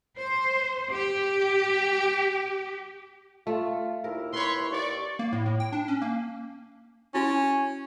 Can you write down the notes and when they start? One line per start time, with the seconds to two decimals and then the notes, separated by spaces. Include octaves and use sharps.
0.17 C5
0.93 G4
3.47 A3 F4
4.04 D#2 E4 A#4
4.33 B4 C#5 B5 C6
4.71 D#2 D5 C#6
5.19 A#3
5.33 A2
5.46 A2
5.60 G5
5.72 D4
5.88 C#4
6.02 A#3
7.14 C#4 E4 F#4 G#5